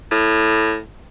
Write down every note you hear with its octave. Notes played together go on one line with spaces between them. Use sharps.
A2